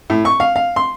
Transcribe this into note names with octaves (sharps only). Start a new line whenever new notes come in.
A2
C#6
F5
F5
C6